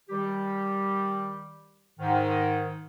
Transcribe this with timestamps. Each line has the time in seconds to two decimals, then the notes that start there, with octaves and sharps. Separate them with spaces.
0.09 D#3 G3 G4
1.99 G#2 D#3